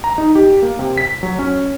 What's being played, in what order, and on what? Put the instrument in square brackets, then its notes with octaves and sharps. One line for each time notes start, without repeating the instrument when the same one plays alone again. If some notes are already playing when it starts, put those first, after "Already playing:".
[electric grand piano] A#5
D#4
G4
A#3
C3
B6
F#3
C#4